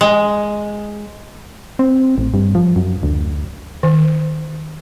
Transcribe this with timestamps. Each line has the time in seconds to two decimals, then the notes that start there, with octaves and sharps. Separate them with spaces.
0.01 G#3
1.79 C4
2.18 A1
2.34 G2
2.55 F3
2.76 F#2
3.03 D2
3.83 D#3